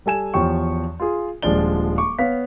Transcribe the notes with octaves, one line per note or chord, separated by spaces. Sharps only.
G3 A4 G#5 E7
E2 F3 G4 C#5 G5 C#6
F4 G#4
D#1 F3 G#3 D4 D5 G7
C#6 D6
B3 C#5 F5 B6